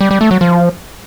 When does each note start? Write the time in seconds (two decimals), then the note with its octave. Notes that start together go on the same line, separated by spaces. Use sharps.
0.01 G3
0.11 G3
0.21 A3
0.31 F#3
0.41 F3